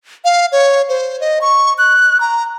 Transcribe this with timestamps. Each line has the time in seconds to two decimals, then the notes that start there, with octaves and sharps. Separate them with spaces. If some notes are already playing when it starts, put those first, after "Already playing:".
0.25 F5
0.52 C#5
0.89 C5
1.21 D#5
1.41 C#6
1.78 F#6
2.21 A#5